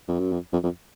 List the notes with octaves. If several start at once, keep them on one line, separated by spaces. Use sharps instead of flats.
F2
F#2
F2
F2
F2